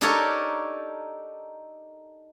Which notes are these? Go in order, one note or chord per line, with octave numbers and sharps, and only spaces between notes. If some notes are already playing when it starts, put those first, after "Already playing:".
D4 D#4 G4 A4 A#4 C#5